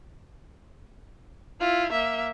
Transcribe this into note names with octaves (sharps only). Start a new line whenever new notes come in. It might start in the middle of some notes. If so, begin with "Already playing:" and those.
E4 F4
A#3 E5